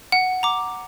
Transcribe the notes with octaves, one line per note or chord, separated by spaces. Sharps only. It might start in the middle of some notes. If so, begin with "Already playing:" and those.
F#5
A#5 D6